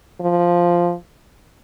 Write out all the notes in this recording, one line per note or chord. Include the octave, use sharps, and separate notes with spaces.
F3